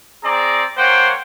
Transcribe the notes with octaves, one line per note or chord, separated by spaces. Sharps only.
C4 G#4 D5 A#5
A#3 C5 C#5 F#5 G5